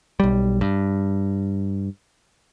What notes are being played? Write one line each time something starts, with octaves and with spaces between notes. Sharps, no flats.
B1 G3
G2